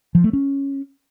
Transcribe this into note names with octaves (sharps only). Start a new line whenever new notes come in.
F3
A3
C#4